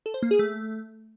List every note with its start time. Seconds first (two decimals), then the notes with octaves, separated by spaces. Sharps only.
0.06 A4
0.14 C5
0.22 A#3
0.31 G#4
0.39 A3